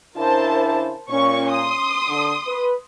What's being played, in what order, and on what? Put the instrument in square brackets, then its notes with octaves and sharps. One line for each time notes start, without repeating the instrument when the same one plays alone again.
[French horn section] C#3 D4 E4 [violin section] A#4 C5 A5
[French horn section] A#2 [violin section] C#4 C#6
[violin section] C6 D#6
[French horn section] D3
B4